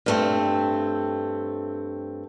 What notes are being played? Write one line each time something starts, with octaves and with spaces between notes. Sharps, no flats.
G2 A3 C4